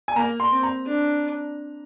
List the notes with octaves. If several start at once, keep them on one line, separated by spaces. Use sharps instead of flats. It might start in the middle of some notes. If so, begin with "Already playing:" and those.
G#5
A#3 A#5
C6
C4
A#5
D4